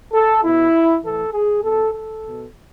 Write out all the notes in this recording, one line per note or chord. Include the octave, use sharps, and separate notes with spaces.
A4
B2 E4
A2 E3 A4
G#4
B2 A4
A4
B2